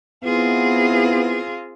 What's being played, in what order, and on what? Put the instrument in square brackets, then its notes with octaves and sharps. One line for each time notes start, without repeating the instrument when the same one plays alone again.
[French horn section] B3 E4 [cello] C4 G#4 [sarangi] F4